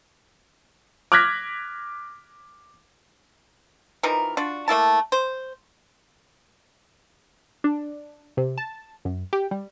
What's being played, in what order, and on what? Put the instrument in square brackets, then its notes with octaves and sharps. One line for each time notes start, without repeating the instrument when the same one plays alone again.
[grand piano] D6 F6 F#6 G#6 A#6 B6
[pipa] E3 F3 D#4 A#4
D4 F4 F#4
A3 A#3 E4 A5
C5
[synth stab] D4
C3
A5
F#2
G4
G3